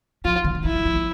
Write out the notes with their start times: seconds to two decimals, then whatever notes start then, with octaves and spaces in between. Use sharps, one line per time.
0.25 F3 F4
0.45 D3
0.55 D3
0.64 E3 E4
0.75 G3
0.85 F3
0.96 F3